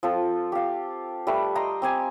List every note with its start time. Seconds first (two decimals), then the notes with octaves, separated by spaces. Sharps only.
0.03 F3 C4 F4 A4
0.52 G4 F5
1.27 G3 A3 B4
1.55 D#5 G5 A#5 C6
1.82 C4 G4 G#5